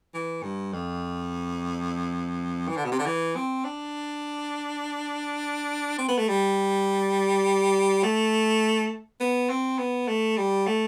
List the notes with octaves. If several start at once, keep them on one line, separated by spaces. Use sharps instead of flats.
E3
G2
F2
E3
D3
B2
C3
D3
E3
C4
D4
C4
B3
A3
G3
A3
B3
C4
B3
A3
G3
A3